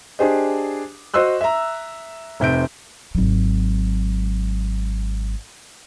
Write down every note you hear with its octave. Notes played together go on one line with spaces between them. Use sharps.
D4 G4 G#4 C5 D#5
F#4 C5 D#5 C6 E6 F#6
E5 A#5
F1 C3 G6 D7
G#1 F#3